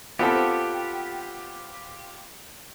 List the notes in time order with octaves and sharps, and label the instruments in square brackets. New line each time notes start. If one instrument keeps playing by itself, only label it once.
[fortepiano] B3 C4 A4 [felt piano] F4 [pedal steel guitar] G4